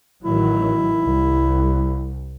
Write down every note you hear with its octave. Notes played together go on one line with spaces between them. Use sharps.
A1 D#3 F#3 E4
C2